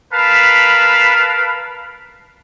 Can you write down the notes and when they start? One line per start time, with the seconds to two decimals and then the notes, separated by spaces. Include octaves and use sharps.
0.13 A#4 B4 F5 A5 B5